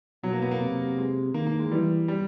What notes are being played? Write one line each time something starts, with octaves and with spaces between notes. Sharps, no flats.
B2 F#3
A#3
B3
A#3
C3
G#3
D#3 A#3
A#3
G#3
E3 G3
G3